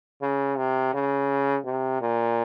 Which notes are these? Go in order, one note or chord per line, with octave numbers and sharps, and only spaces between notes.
C#3
C3
C#3
C3
A#2